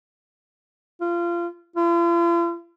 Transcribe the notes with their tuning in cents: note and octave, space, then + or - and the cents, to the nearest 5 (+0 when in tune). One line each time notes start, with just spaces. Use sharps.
F4 -25
F4 -45